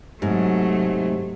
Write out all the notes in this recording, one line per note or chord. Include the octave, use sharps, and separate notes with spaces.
G#2 C3 F#3 A3